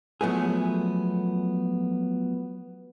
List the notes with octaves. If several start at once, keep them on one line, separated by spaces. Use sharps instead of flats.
F3 F#3 A3 B3 G#4